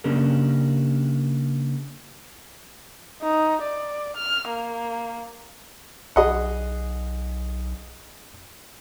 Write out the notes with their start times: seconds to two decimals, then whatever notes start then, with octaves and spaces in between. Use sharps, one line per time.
0.04 C#3 A#3 C#4 D4 G4 A#4
3.22 D#4
3.62 D5
4.16 F6
4.49 A#3
6.16 B1 G#4 D#5 F#5